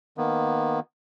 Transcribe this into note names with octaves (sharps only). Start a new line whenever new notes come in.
D#3 A#3 B3